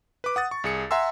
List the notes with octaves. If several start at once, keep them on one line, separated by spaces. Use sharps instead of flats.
B4 D6
F#5 D#6 A6
C#6
C2 G#4 C#7
E5 F#5 G#5 A#5 C6 E6